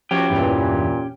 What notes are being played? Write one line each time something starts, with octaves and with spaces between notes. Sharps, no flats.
F3 C#4 F#4 G4
E2 G2 A#2 E3